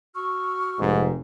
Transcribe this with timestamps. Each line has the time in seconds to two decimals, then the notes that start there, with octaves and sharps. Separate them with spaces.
0.16 F#4 C#6 E6 F6
0.79 F1 G#2